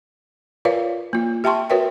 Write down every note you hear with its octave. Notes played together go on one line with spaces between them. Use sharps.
F4 A#4 B4 C#5 D5 F5
A#3 F4
G4 E5 G5 A5 C6 C#6
F#4 A#4 B4 C#5 E5 G5